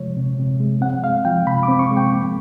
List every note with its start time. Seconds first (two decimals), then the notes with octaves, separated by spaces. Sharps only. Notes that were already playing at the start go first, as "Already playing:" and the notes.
Already playing: C3 F3 G#3 C#5
0.17 C3
0.39 C3
0.60 G#3
0.81 C4 F#5
1.04 G#3 F5
1.25 F3 G5
1.47 C3 B5
1.63 D6
1.68 C4
1.79 C#6
1.90 G#3
1.97 G5
2.13 A#3